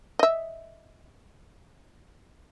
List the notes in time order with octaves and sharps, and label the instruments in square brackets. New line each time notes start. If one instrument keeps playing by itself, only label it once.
[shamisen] D#5 E5